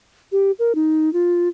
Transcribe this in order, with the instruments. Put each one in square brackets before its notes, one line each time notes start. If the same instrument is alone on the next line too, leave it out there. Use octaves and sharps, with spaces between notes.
[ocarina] G4
A#4
D#4
F4